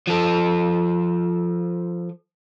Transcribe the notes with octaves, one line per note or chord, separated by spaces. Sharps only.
F3 A4